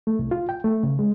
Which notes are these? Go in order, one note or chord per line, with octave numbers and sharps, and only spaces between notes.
A3
C2
F4
G5
A3
C#3
G#3